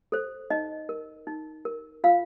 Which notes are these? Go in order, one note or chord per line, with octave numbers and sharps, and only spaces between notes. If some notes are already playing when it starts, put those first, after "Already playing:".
A4 C5
D#4 D#5
A#4
D#4
A#4
F4 F5